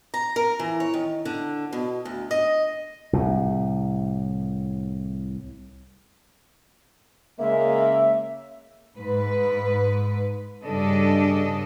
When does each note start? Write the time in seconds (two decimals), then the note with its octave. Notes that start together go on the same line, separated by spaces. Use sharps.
0.14 A#5
0.36 A#4
0.59 E3
0.80 C#5
0.94 D#3
1.25 D3
1.73 B2
2.05 D2
2.31 D#5
3.13 C2 A2
7.39 C#3 G#3 A#3 E5
8.97 G#2 B4
10.64 G2 C#3 G3 D4 A4 D#5